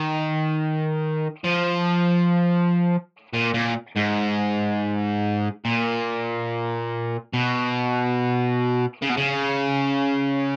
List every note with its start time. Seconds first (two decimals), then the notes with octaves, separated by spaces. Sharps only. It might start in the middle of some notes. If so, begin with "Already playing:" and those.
Already playing: D#3
1.44 F3
3.34 A#2
3.54 A#2
3.97 G#2
5.65 A#2
7.33 B2
9.02 C#3
9.09 B2
9.17 C#3